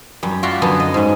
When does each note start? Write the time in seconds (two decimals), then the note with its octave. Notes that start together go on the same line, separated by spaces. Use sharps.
0.23 F#2 G3
0.43 F4 F#4 D5 E5 F5 G5
0.62 F#2 D3 B3 A5
0.80 D#5
0.94 G#2 C#4